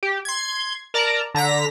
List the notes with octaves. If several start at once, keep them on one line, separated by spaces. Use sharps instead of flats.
G4
C6 G#6
A#4 D5 A5 A#5
D3 A#5 A#6 B6